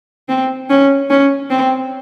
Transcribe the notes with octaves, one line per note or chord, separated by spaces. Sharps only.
C4
C#4
C#4
C4